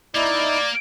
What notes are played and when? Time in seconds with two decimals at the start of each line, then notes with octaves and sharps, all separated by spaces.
0.15 A#3 D#4 E4 D5